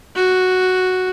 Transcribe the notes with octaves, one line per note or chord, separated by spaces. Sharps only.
F#4